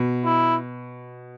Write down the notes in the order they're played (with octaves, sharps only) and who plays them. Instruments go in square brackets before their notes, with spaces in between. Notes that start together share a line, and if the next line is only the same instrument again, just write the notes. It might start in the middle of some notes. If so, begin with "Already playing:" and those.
Already playing: [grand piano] B2
[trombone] E4